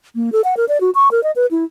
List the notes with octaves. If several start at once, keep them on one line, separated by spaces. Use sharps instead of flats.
A#3
A4
F#5
A#4
D5
F#4
C#6
A#4
D#5
B4
E4